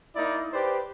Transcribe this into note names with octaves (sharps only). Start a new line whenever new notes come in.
A#3 D#4 E4 D5
G4 B4 C5 D5